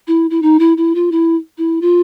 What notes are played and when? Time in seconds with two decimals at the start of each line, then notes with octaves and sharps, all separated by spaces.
0.08 E4
0.31 E4
0.42 D#4
0.59 E4
0.77 E4
0.95 F4
1.12 E4
1.58 E4
1.81 F4